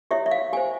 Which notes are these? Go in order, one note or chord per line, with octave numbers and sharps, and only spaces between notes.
E4 G4 C#5 E5
E5
F5
G4 C5 G#5